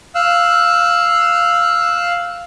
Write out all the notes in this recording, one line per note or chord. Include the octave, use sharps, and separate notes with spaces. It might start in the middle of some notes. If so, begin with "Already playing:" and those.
F5 E6 F#6